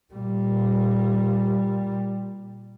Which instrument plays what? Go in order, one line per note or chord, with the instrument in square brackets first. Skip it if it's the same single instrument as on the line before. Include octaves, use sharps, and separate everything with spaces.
[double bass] A#2 G3